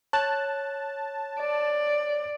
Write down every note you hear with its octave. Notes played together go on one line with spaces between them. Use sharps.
C#5 A5 F#6
D5